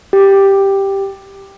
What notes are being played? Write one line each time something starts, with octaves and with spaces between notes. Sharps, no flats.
G4